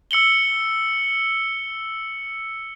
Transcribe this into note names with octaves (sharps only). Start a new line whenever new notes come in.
E6 C#7 F#7 G7